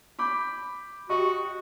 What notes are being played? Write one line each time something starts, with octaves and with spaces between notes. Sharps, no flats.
B5 D6 G6
F#4 G4 D#5 C#6